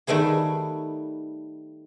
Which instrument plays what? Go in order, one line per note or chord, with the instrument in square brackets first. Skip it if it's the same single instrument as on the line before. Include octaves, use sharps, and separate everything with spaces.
[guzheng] D#3 G3 A3 B3 G#4